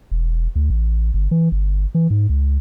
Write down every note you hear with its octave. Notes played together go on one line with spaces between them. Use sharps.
E1
D2
A1
G1
E3
G1
E3
G#2
C#2